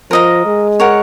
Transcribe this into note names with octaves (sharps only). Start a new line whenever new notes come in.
F3 A#4 D#5 A#5
G#3
A#4 C#5 F#5